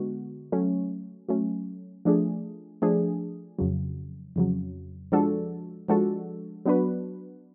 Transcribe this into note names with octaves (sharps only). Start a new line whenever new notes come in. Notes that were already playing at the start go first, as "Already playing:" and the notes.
Already playing: D3 G#3 B3 F#4
F#3 A3 C#4
F#3 A3 C#4
F3 A3 D4 G#4
F3 A3 D4 G#4
F2 C#3 F#3
F2 C#3 F#3
F3 G#3 D4 F#4 A4
F3 G#3 D4 F#4 A4
F#3 B3 D4 F#4 B4